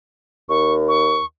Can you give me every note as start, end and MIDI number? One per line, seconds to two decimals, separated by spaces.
0.49 1.20 39
0.49 0.74 85
0.88 1.25 85